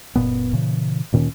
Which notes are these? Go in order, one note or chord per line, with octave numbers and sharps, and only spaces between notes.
F#1 A#2 B3
A#2 C#3 E3
D2 A#2 D#3 C#4